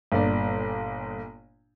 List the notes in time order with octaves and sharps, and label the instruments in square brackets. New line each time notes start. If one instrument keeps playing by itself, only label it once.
[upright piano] G1 A#2 D5